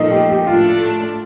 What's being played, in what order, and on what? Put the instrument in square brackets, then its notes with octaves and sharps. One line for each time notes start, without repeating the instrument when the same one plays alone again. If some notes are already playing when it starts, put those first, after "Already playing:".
Already playing: [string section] A#2 F3 A3 [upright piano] D#4
[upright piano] G4
G4
[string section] A2 A3 D4 [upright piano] F4